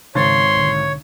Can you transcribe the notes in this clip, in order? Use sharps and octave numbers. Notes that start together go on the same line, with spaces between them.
G#1 G#2 C#3 C#5 C6 A6
B1 D3